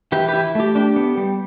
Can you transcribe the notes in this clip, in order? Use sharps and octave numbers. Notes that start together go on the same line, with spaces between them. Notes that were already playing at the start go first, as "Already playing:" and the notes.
E3 G4 B4
E4 G4 B4
A3 G4
D4 G4
B3
G3